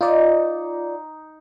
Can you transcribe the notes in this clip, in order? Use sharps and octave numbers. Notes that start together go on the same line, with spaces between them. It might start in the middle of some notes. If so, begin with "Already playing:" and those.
D#4 F4 D5